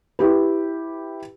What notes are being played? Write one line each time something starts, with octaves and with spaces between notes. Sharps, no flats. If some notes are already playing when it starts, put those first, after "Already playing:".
E4 G4 B4